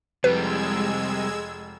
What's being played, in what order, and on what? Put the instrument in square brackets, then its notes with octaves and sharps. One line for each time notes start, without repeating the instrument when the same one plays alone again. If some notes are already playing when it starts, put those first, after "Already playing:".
[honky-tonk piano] F1 [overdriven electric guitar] C3 G3 [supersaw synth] G#3 E6 G#6 [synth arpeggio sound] B4